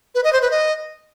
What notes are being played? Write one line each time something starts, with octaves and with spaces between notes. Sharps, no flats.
B4
D#5
C5
B4
D#5